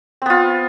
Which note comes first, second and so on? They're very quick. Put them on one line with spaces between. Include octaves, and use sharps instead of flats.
C4 B3 F4